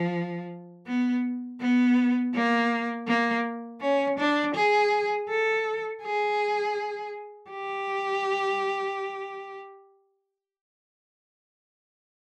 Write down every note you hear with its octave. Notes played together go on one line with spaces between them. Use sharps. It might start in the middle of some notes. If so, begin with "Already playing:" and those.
Already playing: F3
B3
B3
A#3
A#3
C#4
D4
G#4
A4
G#4
G4